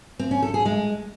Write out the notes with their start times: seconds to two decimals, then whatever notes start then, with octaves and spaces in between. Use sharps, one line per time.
0.19 C4
0.31 C#4
0.42 A4
0.54 G#4
0.65 G#3